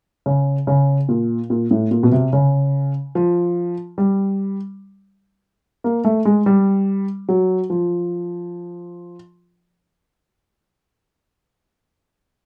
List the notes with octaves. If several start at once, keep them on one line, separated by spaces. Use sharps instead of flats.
C#3
C#3
A#2
A#2
A2
A#2
B2
C3
C#3
F3
G3
A#3
A3
G#3
G3
F#3
F3